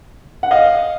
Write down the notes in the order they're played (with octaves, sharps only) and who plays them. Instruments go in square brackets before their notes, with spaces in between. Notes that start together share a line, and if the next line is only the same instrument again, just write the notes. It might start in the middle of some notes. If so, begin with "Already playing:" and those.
[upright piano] F#5
D#5 F5